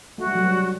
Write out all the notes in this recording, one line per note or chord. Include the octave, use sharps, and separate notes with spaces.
A3 F#4
G3
F#3
G3